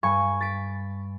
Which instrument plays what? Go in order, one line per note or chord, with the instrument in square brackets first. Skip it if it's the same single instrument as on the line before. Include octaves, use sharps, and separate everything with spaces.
[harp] G2 G#5 C#6
A6 B6 D7